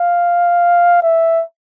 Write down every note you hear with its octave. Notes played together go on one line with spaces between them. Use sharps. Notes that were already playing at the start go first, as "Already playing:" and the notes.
Already playing: F5
E5